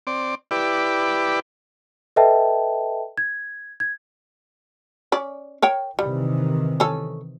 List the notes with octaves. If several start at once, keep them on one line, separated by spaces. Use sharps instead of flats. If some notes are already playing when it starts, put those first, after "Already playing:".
C4 D5
E4 G4 B4 D5
A4 B4 D#5 E5 G5 A5
G#6
G#6
C#4 D5
A#4 C#5 G5
C3 D#3 E3 G3
C#4 A4